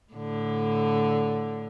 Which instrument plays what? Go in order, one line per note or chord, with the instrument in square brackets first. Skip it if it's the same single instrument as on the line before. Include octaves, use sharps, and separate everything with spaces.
[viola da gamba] A2 D3